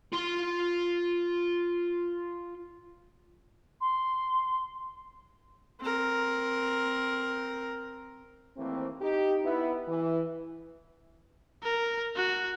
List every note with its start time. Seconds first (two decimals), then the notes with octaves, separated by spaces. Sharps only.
0.13 F4 C6
3.81 C6
5.80 C4 A#4
8.57 D#2 E3 A3 A#3 C4
9.01 D#4 G4
9.43 B3 E4
9.88 E3
11.63 A#4
12.16 F#4